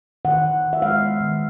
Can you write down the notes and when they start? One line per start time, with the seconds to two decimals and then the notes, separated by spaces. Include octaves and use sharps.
0.25 D#3 F#5
0.44 D#3
0.63 D#3
0.73 E5
0.82 G#3 F5
1.02 B3
1.21 D#3